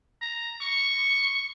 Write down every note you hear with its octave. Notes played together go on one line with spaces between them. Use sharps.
A#5
C#6